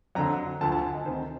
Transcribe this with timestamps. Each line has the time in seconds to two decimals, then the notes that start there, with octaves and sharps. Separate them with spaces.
0.15 F2 D3 F#3 A#5
0.61 D2 D3 F3 A5
0.72 A5
0.83 G#5
0.95 D#5
1.05 D2 C3 D#3 C5